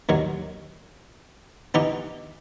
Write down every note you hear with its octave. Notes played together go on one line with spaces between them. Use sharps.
D#2 D#3 F#3
E3 B3 D#4 G4